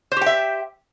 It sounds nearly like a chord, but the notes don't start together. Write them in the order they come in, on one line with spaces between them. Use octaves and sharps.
C5 G4 G5 E5